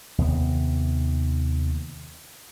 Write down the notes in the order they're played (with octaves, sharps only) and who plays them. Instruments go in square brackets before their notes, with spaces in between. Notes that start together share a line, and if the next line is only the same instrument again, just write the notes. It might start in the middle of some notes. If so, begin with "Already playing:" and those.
[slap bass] D#2 C3 B3